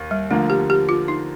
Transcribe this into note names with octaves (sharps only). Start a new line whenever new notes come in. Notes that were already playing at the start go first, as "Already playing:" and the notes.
Already playing: D#2
G3
D3 F3 A3 A#3
G4
G4
F4
D#4